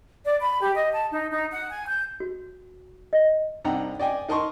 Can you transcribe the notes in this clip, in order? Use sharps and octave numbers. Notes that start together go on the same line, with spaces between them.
D5
B5
G4
D#5
A5
D#4
D#4
F#5
G#5
G6
F#4
D#5
C2 D4 D#4 F#5 G5 A#5
D5 D#5 G5 G#5
D#4 A#4 D#5 A5 C6 C#6